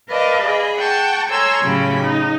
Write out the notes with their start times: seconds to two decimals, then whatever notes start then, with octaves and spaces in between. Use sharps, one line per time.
0.10 A#4 B4 D5 D#5 F5 A5
0.43 G#4 D#5 B5
0.79 F#5 G5 A5 C#6
1.30 A4 C#5 G#5 A#5 C6 E6
1.63 A2 C#3 F#3 C#4 G4 B5
2.03 D#4